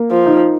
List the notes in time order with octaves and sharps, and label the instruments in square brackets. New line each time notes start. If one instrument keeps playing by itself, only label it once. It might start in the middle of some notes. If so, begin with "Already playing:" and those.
Already playing: [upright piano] A#3
[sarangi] F3
[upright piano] D#4